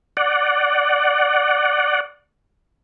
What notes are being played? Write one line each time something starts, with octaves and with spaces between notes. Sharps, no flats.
D5 F#5